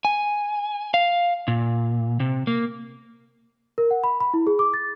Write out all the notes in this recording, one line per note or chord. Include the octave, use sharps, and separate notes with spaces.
G#5
F5
A#2
C3
A#3
A#4
F#5
B5
B5
E4
G#4
D6
A6